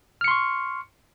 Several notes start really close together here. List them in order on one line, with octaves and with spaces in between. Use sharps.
F6 C#7 C6 C#6